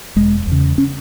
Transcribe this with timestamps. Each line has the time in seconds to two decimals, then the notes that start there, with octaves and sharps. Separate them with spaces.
0.16 E1 G#3
0.47 E2 C#3
0.78 C#4